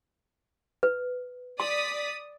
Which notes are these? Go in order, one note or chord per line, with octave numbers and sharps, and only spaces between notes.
B4
D5 C6 D#6 B6